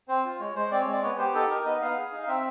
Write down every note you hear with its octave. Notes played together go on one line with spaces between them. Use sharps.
C4 C5
F4
G#3 C#5
G#3 C5
C4 D5
C#5
G#3 D5
B3 C#5
G4 C5
D#4 A4
D#4 A#4
B3 D#5
B3 F5
G#4
D#4
F5
C4 E5